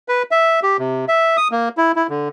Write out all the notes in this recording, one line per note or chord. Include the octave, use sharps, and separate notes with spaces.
B4
E5
G4
C3
E5
D#6
A#3
E4
E4
D3